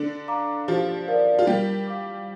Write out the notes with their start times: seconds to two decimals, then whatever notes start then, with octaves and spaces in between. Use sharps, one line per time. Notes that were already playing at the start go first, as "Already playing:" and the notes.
Already playing: D3 D4
0.28 F5 A#5 D6
0.68 F3 F4 G4
1.08 A#4 D5 F5
1.39 F4
1.47 G3 G4 A#4
1.87 F5 D6